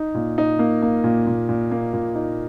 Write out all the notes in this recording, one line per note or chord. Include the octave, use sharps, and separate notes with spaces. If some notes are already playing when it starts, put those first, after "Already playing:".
Already playing: D#4
A#2
D#4
A#3
A#3
A#2
A#2
A#2
A#3
A#2
D#4